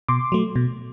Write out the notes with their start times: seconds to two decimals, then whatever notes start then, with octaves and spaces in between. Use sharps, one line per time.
0.08 B2 C6 D6
0.32 F#3 A3
0.56 B2